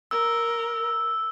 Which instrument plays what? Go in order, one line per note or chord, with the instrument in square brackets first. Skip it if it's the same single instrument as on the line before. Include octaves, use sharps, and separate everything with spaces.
[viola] A#4 [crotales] E6